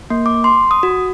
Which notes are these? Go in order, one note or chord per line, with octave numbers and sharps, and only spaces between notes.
A#3
D6
C6
D#6
F#4